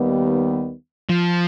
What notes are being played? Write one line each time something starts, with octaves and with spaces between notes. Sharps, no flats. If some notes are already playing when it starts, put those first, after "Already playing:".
Already playing: D#2 D#3 G3 B3
F3